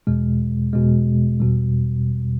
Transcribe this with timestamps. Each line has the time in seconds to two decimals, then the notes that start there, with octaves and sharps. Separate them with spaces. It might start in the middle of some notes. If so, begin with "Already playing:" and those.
0.07 E2 B2 G#3
0.73 E2 B2 G#3
1.40 E2 B2 G3